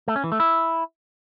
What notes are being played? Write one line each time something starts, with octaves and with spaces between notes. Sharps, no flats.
A3
C#4
E3
A3
E4